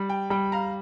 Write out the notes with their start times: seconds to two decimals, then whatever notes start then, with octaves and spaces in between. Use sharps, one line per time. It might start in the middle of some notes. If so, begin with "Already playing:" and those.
Already playing: G3
0.09 G5
0.30 G3 G5
0.52 F5 A#5